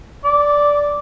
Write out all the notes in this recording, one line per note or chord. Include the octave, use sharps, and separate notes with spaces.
D5